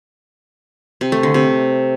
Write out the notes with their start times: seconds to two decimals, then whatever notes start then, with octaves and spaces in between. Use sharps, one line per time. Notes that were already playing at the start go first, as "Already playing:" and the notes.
1.01 C3
1.12 A3
1.23 D3
1.34 C3